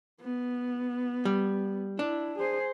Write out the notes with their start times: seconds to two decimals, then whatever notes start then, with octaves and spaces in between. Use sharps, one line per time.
0.21 B3
1.25 G3
1.99 D4 E4
2.38 G#4 C5